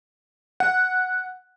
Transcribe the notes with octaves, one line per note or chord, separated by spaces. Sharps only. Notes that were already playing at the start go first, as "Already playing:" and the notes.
F#5